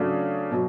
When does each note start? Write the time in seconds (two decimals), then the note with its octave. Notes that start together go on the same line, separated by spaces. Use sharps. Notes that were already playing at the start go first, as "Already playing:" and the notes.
Already playing: C#3 F#3 A3 D4
0.51 B2 F#3